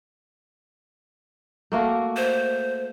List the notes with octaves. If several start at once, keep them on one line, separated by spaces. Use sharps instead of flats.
A3 A#3 F#4
C5